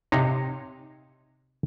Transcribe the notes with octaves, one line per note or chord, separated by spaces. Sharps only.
C3 D#4 C#5 F5